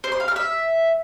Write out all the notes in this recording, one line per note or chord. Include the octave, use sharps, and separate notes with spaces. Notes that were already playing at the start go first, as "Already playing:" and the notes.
C5
C6
F5
F6
E5